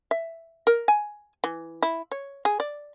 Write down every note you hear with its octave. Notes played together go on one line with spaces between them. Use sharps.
E5
A#4
G#5
E3
E4
C#5
G#4
D5